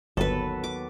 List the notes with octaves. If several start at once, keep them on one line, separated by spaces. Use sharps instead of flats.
G1 D#2 F#3 B3 A4 B4
D6